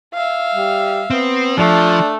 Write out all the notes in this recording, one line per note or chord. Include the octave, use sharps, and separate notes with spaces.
E5 F5
G3
B3 C4
F3 A3 D4